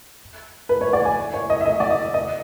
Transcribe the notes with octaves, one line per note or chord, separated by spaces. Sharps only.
B4
C#5
D5
G#5
C#5
D#5
E5
D#5
D5
D#5
D#5